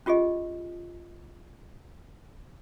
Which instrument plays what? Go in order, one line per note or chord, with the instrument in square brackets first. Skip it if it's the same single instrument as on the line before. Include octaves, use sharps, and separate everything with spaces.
[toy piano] C#4 F4 G4 G#4 D#5